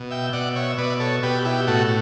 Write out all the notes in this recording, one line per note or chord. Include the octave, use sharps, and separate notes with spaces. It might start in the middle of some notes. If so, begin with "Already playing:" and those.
Already playing: B2
E5 G5
B2 D5 F#5
C#5 E5
B2 B4 D5
A4 C#5
B2 G4 B4
E4 G4
A2 F#4 A4